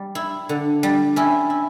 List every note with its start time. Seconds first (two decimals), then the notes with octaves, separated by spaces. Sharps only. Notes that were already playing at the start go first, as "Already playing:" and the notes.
Already playing: G3
0.15 E4
0.49 D3
0.83 G3
1.16 C#4 E4
1.50 E4